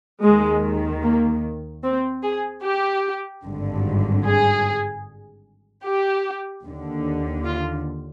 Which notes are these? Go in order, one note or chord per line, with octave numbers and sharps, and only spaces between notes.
D#2 D#3 G#3
A#3
C4
G#4
G4
G#1 G2 D3
G#4
G4
D#2 D3
F4